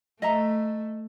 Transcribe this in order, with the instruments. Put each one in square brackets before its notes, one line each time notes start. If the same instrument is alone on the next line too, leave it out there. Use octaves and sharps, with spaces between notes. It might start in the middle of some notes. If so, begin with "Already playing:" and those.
[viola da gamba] A3 [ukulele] D#5 E5 A#5